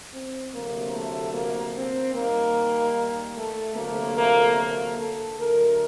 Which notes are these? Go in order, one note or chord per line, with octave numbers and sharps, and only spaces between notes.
C4
D2 C3 F#3 A#3
A3
A#3
C4
D#2 D#3 G3 A#3
A3
D2 C3 F#3 A3 A#3
A#3
A#3
A4
D2 D3 F#3 A3 A#4